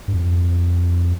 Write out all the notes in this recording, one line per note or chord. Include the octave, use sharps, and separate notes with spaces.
G2
F2